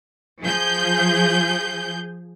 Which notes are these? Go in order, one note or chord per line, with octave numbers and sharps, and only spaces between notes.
F3 G#4 G6